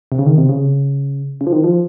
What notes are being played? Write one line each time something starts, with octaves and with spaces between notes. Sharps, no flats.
C3
C#3
D#3
C3
C#3
C#3
F3
D#3
F3